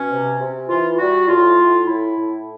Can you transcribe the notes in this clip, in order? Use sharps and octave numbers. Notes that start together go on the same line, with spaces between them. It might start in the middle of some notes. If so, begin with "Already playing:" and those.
Already playing: B2 C#4
C3
C3
E3 F4
F4
G3 F#4
A2 F4
A2
A2 E4
A2